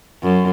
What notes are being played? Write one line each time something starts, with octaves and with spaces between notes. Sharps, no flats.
F#2